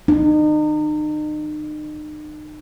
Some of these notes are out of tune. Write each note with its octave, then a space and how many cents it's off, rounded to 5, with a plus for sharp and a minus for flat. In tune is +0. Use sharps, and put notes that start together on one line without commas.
D#4 -40